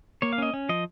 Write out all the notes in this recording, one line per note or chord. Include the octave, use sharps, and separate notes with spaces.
A#3 C#5
F5
C#4 D#5
C#4
F3 D#5